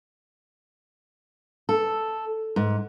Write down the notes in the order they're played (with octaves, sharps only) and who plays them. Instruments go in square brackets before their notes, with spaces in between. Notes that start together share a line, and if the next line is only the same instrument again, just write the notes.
[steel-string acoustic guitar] A4
G#2